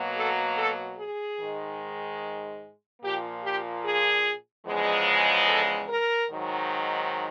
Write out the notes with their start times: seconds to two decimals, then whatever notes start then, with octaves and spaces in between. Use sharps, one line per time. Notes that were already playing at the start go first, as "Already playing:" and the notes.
Already playing: B2 F#3 A#3
0.17 A4
0.58 A4
0.99 G#4
1.40 G#2 D#3 G#3
3.02 A#2 F3 A#3 G4
3.44 G4
3.85 G#4
4.66 E2 C#3 F3 G#3
5.48 A4
5.89 A#4
6.30 G#2 D#3 F#3